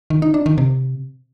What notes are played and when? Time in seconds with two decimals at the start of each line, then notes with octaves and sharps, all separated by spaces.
0.10 D#3
0.22 D#4
0.34 D4
0.46 D#3
0.58 C3